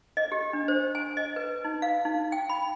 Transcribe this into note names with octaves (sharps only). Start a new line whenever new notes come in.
D#5
G4
D4
C5
G#5
D#5
B4
D#4
F5
D#4
G5
B5